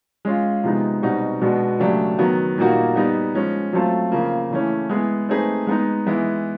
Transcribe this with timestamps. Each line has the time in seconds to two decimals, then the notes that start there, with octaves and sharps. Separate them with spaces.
0.25 G#3 C#4 F4
0.64 C3 F3 G#3 B3 D#4
1.02 B2 G3 C4 D#4 F#4
1.41 B2 G#3 B3 D4 F#4
1.80 C#3 F#3 A3 D4 G4
2.18 D#3 F#3 B3
2.58 A#2 G3 A#3 D#4 F#4
2.96 G3 B3 D#4
3.34 F3 G#3 C#4
3.73 F#3 A3 C4 F4 A4
4.12 C#3 F3 A#3
4.50 C#3 E3 A3 C#4
4.89 G#3 B3 E4 G#4
5.29 A3 C4 D#4 G#4 B4
5.67 G#3 B3 D#4
6.06 E3 G#3 B3 E4